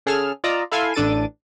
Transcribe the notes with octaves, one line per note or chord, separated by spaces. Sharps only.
C#3 G#4 A4 F6 E7
F4 D5 D#5 A#5 D6 E6
E4 A4 F5 G#5 C6 E6
A1 D4 A4 A6 D7 D#7